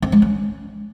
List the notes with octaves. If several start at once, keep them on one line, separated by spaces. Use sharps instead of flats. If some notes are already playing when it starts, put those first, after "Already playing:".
C4
G#3
C#4